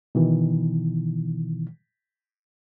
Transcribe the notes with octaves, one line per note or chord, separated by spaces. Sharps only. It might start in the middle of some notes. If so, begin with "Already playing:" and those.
B2 D#3 E3